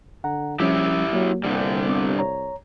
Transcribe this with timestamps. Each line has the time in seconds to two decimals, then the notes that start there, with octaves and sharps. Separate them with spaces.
0.24 D3 F#5 A#5
0.60 A#1 F3 G3 C#4 E4 G4 E5
1.13 F#3 A#3
1.44 C2 G2 D3 G3
1.87 B3 C4 D6
2.19 C#5 A#5